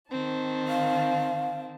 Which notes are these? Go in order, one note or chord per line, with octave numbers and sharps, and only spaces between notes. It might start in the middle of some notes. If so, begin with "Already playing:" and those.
D#3 C4 A5
F5